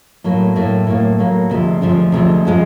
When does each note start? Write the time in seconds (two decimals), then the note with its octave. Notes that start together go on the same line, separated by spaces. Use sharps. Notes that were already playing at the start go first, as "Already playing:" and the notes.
0.24 A2 F#3 A#3
0.56 A2 F#3 A#3
0.87 A2 F#3 A#3
1.19 A2 F#3 A#3
1.50 D2 C3 F3 G#3
1.81 D2 C3 F3 G#3
2.12 D2 C3 F3 G#3
2.45 C3 F3 G#3